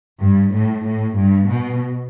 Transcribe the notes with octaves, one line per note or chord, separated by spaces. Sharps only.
G2
A2
A2
G2
B2